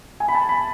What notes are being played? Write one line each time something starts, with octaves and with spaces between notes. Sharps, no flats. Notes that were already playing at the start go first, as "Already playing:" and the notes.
G#5
B5
A5
B5